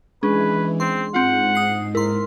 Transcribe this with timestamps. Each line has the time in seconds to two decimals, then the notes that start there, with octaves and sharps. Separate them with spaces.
0.23 E3 G#3 C#4 D4 G#4 B4
0.80 C4 C6
1.14 G#2 C4 F4 F#5
1.55 D#6 C7
1.95 E4 A#4 C6